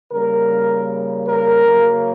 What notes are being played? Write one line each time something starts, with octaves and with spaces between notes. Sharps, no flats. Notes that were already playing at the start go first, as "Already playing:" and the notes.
C#3 G3 A#3 A#4
A#4
C#3 F#3 A#3